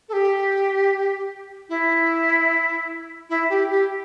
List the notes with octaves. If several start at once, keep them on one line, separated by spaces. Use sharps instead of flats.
A4
G4
E4
E4
G4
G4